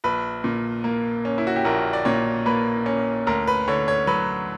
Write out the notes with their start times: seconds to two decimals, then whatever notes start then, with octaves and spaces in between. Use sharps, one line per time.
0.04 A#1 B4
0.44 A#2
0.84 A#3
1.25 C#4
1.38 E4
1.47 F#4
1.56 G4
1.65 A#1 A#4
1.93 D5
2.05 A#2 C#5
2.46 A#3 B4
2.86 C#4
3.27 D2 A#4
3.47 B4
3.68 D3 C#5
3.88 C#5
4.07 F#3 B4